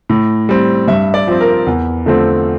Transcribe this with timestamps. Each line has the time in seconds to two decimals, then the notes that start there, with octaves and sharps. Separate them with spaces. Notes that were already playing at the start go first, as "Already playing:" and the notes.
0.09 A2
0.49 G3 C4
0.88 G2 E5
1.14 D5
1.28 F3 C4
1.41 A#4
1.67 E2
2.06 D3 F3 A3 C4